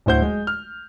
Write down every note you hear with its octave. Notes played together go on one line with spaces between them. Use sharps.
D1 D2 E4 C5 F#5 G6
G#3
F6